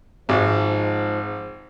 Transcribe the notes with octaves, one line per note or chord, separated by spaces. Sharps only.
G#1 G#2 F3